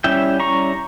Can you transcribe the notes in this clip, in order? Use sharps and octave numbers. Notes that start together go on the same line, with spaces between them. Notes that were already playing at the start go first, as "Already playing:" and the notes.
G3 C#4 E4 E5 G5
A#5 C#6